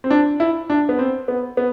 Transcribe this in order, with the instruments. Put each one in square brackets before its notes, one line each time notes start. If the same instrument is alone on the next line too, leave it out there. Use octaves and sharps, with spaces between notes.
[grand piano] C4
D4
E4
D4
B3
C4
B3
B3